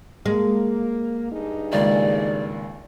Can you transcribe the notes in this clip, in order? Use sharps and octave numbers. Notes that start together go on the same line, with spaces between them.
G#3 A#3
G2 D#4 G#4
G#1 C#2 A#3 D5